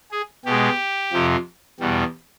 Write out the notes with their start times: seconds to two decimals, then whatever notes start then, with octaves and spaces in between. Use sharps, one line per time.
0.12 G#4
0.45 B2 G#3 G4
1.12 F2 C3 F3
1.80 E2 B2 G3